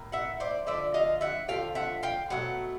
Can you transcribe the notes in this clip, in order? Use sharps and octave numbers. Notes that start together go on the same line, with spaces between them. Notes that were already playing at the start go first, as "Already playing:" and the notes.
Already playing: A2 A#3
E5 F#5
C5 D5
D3 F3 A3 D5 E5
D#5 F5
E5 F#5
D3 F3 A3 F5 G5
E5 F#5
F5 G5
B2 F#3 A3 F#5